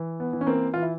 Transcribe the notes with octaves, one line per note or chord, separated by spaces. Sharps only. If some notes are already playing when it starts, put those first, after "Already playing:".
Already playing: E3
B3
E3
C#4
A#3 C4
E3 F4
E4